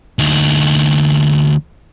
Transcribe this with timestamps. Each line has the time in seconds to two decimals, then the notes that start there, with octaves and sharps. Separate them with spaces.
0.19 D2 D#4